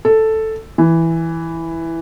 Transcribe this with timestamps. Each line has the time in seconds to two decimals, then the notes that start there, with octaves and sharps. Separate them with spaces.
0.05 A4
0.78 E3